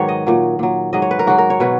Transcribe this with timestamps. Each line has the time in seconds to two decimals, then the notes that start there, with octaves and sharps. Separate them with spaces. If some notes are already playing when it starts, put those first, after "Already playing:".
Already playing: G#2 D#3 F#3 G#4 B4 C#5
0.09 D#5
0.27 A#2 F#3
0.59 A#2 F#3
0.93 G#2 F#3 D#5
1.02 C#5
1.11 B4
1.19 A#4
1.27 G#2 F#3 F#4
1.38 A#4
1.50 C#5
1.60 B2 F#3 B4